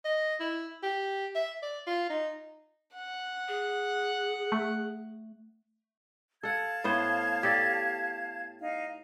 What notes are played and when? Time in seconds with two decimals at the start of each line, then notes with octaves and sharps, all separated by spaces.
0.05 D#5
0.40 E4
0.83 G4
1.35 E5
1.62 D5
1.87 F4
2.10 D#4
2.95 F#5
3.48 G#4
4.52 A3
6.43 A4 F5 F#5 A5 G#6
6.84 A2 B3 C5
7.43 G4 A4 D5
8.61 D#4 F5